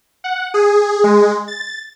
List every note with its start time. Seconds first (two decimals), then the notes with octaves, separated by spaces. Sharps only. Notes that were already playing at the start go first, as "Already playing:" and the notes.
0.24 F#5
0.54 G#4
1.04 G#3
1.48 A6